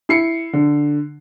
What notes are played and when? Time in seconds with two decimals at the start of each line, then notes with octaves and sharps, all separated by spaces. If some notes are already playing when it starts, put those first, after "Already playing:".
0.09 E4 C7 C#7
0.53 D3